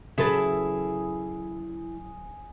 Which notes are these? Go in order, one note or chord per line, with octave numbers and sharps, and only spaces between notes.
C#3 E3 F#3 E4 G#4 A4 B4